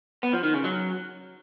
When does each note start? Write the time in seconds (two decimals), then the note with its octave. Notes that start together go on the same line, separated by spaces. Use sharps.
0.23 B3
0.33 F3
0.44 D#3
0.54 C#3
0.64 F#3